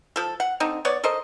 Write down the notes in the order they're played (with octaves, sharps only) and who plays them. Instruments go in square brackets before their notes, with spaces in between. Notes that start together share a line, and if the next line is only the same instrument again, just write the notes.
[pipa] F3 A4
F#5
D3 C4 D#4
B3 C#5 D5
A4 A#4 C5 D#5